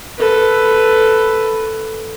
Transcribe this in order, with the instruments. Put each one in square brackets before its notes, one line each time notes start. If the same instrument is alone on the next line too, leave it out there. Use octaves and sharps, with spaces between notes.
[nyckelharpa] A4 B4